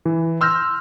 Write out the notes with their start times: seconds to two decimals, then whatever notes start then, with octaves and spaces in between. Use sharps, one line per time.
0.06 E3
0.41 C6 E6 F6 G6 A#6